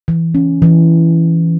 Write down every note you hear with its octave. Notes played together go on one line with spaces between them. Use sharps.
E3
C#4
E3